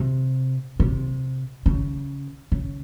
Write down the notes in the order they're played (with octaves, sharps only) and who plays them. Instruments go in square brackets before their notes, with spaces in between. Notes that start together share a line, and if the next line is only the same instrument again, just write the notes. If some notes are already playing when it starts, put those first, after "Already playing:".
Already playing: [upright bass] C3
C3
C#3
C#3